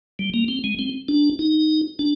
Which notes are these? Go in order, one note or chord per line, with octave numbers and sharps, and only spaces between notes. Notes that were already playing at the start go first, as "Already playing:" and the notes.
G3
A#3
C4
G#3
C4
D4
D#4
D4